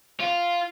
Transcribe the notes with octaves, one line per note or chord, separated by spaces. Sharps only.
F4